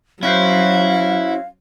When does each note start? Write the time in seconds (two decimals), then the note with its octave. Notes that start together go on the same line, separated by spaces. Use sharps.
0.23 F#3 C#4 E4 F#4 C5 F5